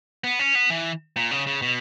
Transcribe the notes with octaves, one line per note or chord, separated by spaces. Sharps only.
B3
C#4
B3
E3
A#2
C#3
C#3
B2